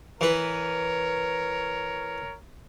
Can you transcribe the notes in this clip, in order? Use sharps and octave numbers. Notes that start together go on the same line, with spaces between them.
E3 A#4 B4 C#5